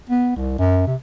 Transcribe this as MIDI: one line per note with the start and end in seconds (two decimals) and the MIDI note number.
0.10 0.33 59
0.36 0.58 36
0.59 0.87 42
0.87 0.96 48